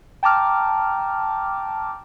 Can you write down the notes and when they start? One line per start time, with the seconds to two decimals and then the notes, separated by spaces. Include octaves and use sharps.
0.23 G5 A5 A#5 D6 F6